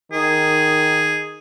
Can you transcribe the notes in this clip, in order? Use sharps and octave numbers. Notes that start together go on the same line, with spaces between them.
D#3 G#4